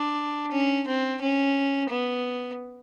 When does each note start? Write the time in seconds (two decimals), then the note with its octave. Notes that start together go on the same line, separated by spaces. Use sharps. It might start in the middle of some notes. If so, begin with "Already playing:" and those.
Already playing: D4
0.52 C#4
0.87 C4
1.21 C#4
1.90 B3